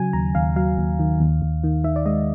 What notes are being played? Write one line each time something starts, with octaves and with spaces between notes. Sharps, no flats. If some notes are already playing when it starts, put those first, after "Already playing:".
Already playing: C#3 F#3 G#5
D#2 A#5
D#2 F5
F#3 F5
D#2
D#3
D#2
D#2
D#3
D#3 E5
D5
G#3 D#5